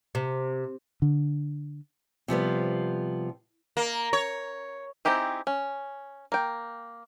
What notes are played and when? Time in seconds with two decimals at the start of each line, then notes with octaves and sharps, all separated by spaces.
0.15 C3
1.02 D3
2.28 C3 F3 G3 B3
3.77 A#3
4.13 C#5
5.05 C4 D#4 E4 G4 G#4
5.47 C#4
6.32 A#3 G5